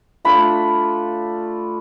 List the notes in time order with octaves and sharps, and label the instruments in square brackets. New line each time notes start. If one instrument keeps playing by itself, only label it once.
[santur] A3 D4 F4 B5